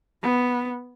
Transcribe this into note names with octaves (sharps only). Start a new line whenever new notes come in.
B3